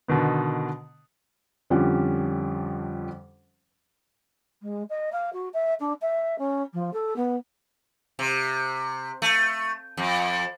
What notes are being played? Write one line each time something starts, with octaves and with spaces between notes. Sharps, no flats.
B2 D3 D#3 B3
F2 D3 F3 G3 C#4
G#3
D#5
F5
F#4
E5
D4
E5
C#4
F3
A4
B3
C3
A3
F2